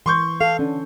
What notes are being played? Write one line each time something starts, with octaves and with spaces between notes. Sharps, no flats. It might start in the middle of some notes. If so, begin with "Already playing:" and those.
E3 C6 C#6 G6
A4 F5
D3 C#4